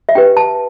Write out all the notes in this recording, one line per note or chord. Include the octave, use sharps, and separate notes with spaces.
E5
D4 G4 B4 G5
A5